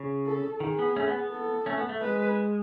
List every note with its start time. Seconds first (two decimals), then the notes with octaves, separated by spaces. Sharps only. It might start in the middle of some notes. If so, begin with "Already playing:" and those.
Already playing: C#3
0.26 A4
0.60 D#3 G#4
0.79 B3
0.96 A3 C#4
1.07 B3
1.19 B3
1.32 A4
1.66 A3 C#4
1.77 B3
1.89 A3
2.01 G#3 B4